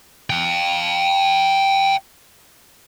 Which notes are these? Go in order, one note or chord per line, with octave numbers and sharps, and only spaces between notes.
F5 G5